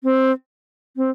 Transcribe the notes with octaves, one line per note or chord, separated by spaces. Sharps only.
C4
C4